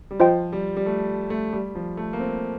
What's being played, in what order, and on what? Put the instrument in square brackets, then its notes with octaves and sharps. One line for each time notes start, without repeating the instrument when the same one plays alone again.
[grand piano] G3
[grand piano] F3 [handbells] F4 C5 D#5 G5
[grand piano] G3
G3
A3
A3
G3
F3
A3
A#3
C4